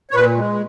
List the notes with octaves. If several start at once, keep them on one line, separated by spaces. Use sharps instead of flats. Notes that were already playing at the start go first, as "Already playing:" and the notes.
C#5
A#2 B4
G#3